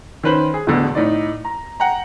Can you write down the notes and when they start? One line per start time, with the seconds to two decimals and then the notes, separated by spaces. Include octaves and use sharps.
0.23 D#3 C#4 B4 C5 F#7
0.54 G#4
0.67 E1 A1 B2 D3
0.95 A2 D#4 D5
1.45 A#5
1.80 F#5 G5 A#5